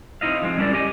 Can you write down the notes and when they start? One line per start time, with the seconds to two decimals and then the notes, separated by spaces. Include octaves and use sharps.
0.21 C4 D#4 E4 D#5 F5
0.42 F3 G#3 C4
0.58 G3 C#4 D4 E4 A#4 D5
0.73 G4 D#5 G#5